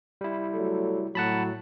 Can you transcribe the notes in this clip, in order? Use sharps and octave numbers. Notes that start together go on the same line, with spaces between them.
G3 E4
F#3 A3 A4
A2 F#3 F#5 A5 B5